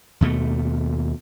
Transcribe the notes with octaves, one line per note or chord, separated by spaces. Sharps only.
D#2 B2 A3